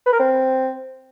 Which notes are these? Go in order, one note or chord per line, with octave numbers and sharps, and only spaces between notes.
B4
A#4
C4